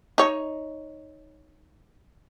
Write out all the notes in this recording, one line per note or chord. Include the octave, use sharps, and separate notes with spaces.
D#4 C#5